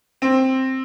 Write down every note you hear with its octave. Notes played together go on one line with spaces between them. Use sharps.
C4